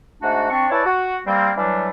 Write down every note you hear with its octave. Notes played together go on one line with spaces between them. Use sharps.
G#2 A3 D4 F#4
C4 D4 C#6
E4 B4 C#5 D5 G#5 A5
F#4
G3 A#3 C4
E3 F#3 G3 A3 D4